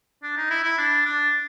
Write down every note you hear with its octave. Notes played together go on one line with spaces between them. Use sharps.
D4
D#4
E4
E4
D4
D4